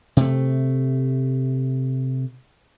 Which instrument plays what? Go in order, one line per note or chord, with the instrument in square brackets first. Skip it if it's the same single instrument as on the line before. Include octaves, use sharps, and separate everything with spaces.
[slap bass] C3 A3